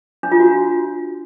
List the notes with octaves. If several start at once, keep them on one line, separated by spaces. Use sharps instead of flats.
D4
F4
F#4